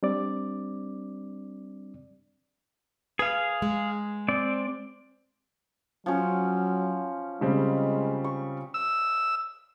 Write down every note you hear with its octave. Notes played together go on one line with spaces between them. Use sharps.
G3 C4 D4 D5
G#4 B4 F5
G#3
C4 D5
F3 F#3 C#4
C#3 G3 G#3 C4
C#6
E6